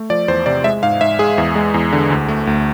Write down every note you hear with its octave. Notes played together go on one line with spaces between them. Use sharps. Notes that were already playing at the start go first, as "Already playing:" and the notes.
Already playing: A3
F3 D5
E2 C5
C3 D5
G#3 E5
G#2 F5
G#2 E5
G#3 G#4
E2
G#3
E2
D3
D2
A3
D2